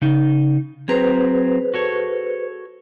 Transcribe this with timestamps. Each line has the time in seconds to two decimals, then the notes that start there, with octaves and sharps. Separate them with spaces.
0.02 C#3 D#4
0.88 F#3 C4 G#4 B4 C5 A#5
1.74 F#4 A4 C#5